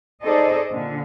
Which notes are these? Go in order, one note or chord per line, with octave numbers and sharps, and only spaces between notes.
D#4 G#4 A4 C5 D5 D#5
A#2 D3